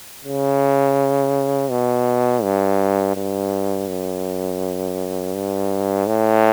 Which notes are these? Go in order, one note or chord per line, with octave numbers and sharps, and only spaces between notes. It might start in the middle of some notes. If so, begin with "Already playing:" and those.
C#3
B2
G2
G2
F#2
G2
A2